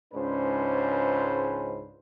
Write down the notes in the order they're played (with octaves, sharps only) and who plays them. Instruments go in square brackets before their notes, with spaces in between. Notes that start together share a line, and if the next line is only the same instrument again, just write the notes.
[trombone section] C#2 G#2 C#4 D4 B4 C5